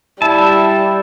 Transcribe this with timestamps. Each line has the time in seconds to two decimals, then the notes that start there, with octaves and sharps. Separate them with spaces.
0.22 G3 E4 A5